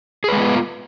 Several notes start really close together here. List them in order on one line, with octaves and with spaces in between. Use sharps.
G#4 B4 G#3 B3 F4